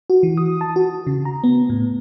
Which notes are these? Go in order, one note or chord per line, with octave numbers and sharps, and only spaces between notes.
F#4
E3
D#6
A5
F#4
C#3
A#5
B3
A2